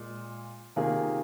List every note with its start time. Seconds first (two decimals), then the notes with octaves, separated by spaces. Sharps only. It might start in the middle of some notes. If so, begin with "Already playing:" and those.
Already playing: A#2 G#3
0.76 C3 D#3 A#3 F4 G#4